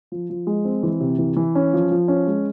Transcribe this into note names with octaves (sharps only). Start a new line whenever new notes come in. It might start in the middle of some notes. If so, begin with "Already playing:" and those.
F3
F3
G#3
C4
E3
C3
E3
E3
C#4
F3
F3
C#4
G#3